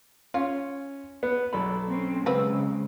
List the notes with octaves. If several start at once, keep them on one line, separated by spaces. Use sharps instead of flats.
C#4 F4
B3
B1 A4 B5
C4 C#4
C#3 G#3 C4 B4